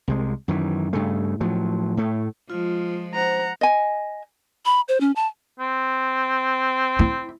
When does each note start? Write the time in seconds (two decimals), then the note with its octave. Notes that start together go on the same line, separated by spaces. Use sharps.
0.08 C2 C3 G#3
0.48 F#2 D#3 E3
0.93 G2 C#3 A3
1.40 A2 F3 F#3
1.97 A2 A3
2.50 F3 G#3 F4
3.14 C5 F#5 A#5
3.61 D#5 G#5
4.65 B5
4.88 C5
5.00 C#4
5.16 A5
5.60 C4
6.99 E4